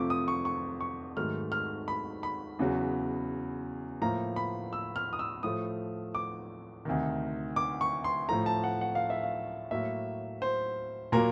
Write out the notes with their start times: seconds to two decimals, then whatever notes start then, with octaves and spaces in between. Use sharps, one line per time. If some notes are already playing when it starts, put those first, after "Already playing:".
Already playing: F2 C3 F3 A3 C#6 D6
0.10 D#6
0.28 C#6
0.45 C#6
0.81 C#6
1.16 G#2 D#3 F#3 A3 F6
1.52 F6
1.88 B5
2.23 B5
2.59 E2 C#3 F#3
4.01 A2 F3 A#3 A#5
4.36 B5
4.73 E6
4.96 F6
5.13 D#6
5.19 E6
5.43 A2 F3 A3 D#6
6.15 D6
6.85 D2 C3 D#3
7.56 D6
7.81 C#6
8.04 C6
8.29 A2 F3 A3 A#5
8.46 A5
8.64 F#5
8.81 F#5
8.95 F5
9.10 E5
9.23 F5
9.71 A2 F#3 A#3 E5
10.42 C5
11.12 A#2 F#3 A#3 A#4